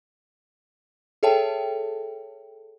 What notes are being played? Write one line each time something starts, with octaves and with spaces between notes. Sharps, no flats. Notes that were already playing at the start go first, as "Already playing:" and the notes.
G#4 A4 C#5 E5 G5 A5